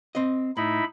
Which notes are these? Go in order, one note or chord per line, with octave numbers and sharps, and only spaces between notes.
C4 D#5
A2 D#4 E4 B5